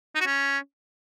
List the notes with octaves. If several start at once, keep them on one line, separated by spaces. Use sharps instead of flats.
D#4
F#4
C#4